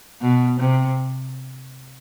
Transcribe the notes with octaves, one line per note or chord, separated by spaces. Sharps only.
B2
C3